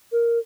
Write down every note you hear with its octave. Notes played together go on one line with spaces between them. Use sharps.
A#4